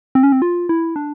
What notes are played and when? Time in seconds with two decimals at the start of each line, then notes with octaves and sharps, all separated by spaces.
0.15 C4
0.23 C#4
0.32 C4
0.42 F4
0.69 E4
0.96 D4